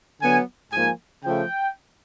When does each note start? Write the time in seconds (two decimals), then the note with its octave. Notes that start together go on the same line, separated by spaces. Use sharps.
0.21 D3 F#3 B3 G#5
0.72 G#2 F3 A#3 G#5
1.24 C#3 F3 A3 G5